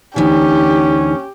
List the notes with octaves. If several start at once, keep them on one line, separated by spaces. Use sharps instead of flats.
D2 E3 C#4 D#4 G4